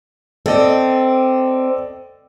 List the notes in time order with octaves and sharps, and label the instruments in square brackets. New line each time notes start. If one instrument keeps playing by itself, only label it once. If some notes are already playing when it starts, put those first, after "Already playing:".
[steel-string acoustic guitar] C4 [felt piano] A4 D5 D#5